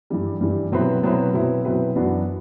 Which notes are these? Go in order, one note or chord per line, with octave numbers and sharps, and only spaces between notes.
G2 E3 G3
G2 E3 G3
B2 F#3 C4 E4 B4
B2 F#3 C4 E4 B4
B2 F#3 C4 E4 B4
B2 F#3 C4 E4 B4
F#2 E3 B3 D4 F#4